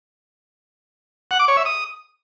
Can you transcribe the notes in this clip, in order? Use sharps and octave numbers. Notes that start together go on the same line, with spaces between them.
F#5
D6
C#5
E5
D#6